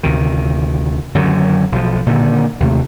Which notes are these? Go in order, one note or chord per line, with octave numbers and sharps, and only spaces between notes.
D2 C3 D#3
F#2 D3 D#3 F#3
B1 F3
A#2 D3 D#3
D#2 C3 A3